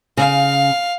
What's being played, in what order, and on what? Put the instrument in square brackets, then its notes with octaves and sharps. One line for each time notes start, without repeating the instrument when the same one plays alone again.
[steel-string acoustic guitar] C#3 [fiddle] F5